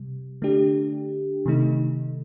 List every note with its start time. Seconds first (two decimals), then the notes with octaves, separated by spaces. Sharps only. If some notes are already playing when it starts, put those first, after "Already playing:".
Already playing: C3 G3
0.42 D3 A3 D4 G4
1.46 C3 D#3 A3 D#4